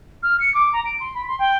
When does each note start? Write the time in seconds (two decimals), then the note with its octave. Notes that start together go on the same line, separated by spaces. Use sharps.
0.23 F6
0.40 C#7
0.54 D6
0.73 A#5
0.85 D7
1.00 C6
1.15 B5
1.28 C6
1.39 G5